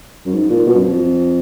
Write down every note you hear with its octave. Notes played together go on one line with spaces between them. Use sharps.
F#2
G#2
A#2
B2
F#2
F2